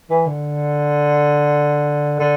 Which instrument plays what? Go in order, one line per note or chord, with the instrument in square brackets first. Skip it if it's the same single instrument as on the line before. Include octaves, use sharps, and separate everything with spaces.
[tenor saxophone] E3
D3
D3